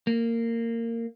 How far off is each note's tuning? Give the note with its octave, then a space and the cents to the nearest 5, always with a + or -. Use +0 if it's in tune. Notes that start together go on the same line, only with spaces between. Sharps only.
A#3 -20